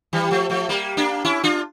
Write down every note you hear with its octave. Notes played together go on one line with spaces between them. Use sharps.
E3 G3
F3 A3
F3 A3
G3 A#3
A#3 D4
C#4 E4
D4 F4